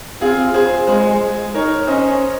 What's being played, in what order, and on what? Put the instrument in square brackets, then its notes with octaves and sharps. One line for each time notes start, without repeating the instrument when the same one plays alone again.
[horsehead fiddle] C4 [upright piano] F4 G#4
[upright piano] G#4 C5
[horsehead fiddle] G#3 [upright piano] G#4 C5
[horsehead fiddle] D#4 [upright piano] A#4 C#5
[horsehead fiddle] C#4 [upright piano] C5 D#5